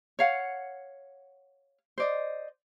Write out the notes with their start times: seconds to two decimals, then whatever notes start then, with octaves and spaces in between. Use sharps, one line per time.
0.19 C#5 F5 F#5
1.98 C5 D5 D#5